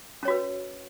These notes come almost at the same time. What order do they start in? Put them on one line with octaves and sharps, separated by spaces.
C#4 C#5 F#4 B4